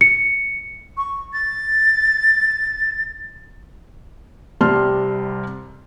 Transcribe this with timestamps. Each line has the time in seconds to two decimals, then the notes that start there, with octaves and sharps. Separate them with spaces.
0.01 C#7
0.97 C#6
1.33 A6
4.61 C2 C3 G3 A5 C6 F6